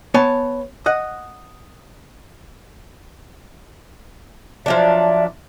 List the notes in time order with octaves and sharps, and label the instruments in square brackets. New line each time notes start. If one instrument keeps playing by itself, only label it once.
[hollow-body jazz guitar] B3 C#5 G#5 A5
D#5 F#5
[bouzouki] F3 F#3 D4 [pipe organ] D5 E5